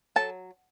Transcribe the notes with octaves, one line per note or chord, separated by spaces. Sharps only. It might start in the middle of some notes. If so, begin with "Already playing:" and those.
F#3 A4 A5